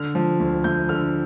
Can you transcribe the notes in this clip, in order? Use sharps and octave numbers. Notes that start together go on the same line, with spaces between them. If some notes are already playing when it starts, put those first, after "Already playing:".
Already playing: D3 F6
F3
D2
D2 G6
D3 F6